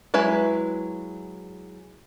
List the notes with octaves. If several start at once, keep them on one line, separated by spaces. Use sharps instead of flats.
F#3 G#3 E4 B4